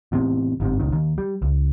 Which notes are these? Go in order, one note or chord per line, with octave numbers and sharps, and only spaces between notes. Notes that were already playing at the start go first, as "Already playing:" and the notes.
E2 A2 C3
G1 G#2 C3
D#1 C#2 D#3
D#2
G3
C#2